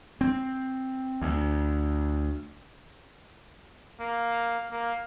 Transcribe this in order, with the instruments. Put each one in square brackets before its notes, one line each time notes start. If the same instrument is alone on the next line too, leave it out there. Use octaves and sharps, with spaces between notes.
[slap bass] C4
D2
[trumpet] A#3
A#3